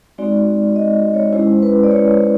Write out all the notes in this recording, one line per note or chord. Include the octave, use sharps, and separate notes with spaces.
G#3 C4 D#4 F#4 D5
D#5
C#5
G#3 C#4 E4 C5
B4
D5
C#5